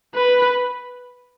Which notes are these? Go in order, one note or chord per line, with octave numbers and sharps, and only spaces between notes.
B4